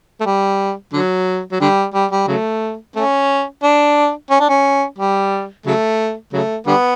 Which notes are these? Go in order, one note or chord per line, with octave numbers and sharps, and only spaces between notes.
A3
G3
D3 F#3
F#3
D3 G3
G3
G3
C#3 F#3 A3
A3 C#4
D4
C#4
D4
C#4
G3
C#3 F#3 A3
C#3 F#3 A3
D3 G3 B3